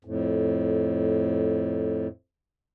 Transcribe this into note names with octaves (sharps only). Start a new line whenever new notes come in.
F2 A2